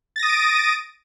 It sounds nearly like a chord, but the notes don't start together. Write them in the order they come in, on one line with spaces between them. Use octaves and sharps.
A6 A#6 D#6 D#7 D7